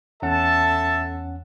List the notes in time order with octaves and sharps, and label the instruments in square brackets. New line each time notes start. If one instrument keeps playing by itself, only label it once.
[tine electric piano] E2 C#4 F#5 [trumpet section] A4 E5 A5